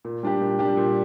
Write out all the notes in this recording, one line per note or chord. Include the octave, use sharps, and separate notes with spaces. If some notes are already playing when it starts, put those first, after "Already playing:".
A#2
G3 D4 G4
A#2
G3 D4 G4
A#2